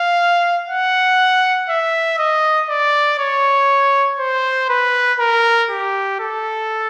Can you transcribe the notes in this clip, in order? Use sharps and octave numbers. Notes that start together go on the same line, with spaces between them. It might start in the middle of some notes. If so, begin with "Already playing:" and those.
Already playing: F5
F#5
E5
D#5
D5
C#5
C5
B4
A#4
G4
A4